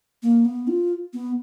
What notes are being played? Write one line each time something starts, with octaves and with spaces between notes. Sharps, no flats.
A#3
B3
F4
B3